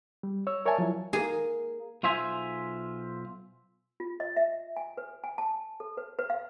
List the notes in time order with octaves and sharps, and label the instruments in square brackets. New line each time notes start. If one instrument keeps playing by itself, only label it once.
[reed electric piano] G3
C#5 E6
A#4 C#5 D5 E5 G#5 A5
F3 F#3 E4
[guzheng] A#3 G#4
[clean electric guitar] B1 F4 C5 E5 G#5
[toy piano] F4
D#5
E5
G#5
B4
G#5
A5
A4
B4
B4
F5